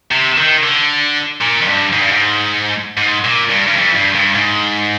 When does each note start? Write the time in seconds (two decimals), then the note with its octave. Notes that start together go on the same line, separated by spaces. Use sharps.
0.11 C3
0.37 D#3
0.63 D3
1.41 A#2
1.61 F2
1.68 G2
1.93 G#2
2.02 G2
2.12 G#2
2.97 G#2
3.24 A#2
3.50 G2
3.67 G2
3.77 F2
3.95 G2
4.15 G2
4.35 G#2